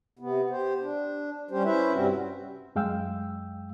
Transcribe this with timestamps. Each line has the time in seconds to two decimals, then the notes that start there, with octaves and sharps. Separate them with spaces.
0.19 C3 B3
0.50 G4 C5
0.80 D4
1.51 G3 C#4 G4 C5
1.65 C#4 E4 B4 C5 E5
1.93 G2 C3 G3 C4 C#4 F#4
2.75 F#2 G#3 F5 G5 E6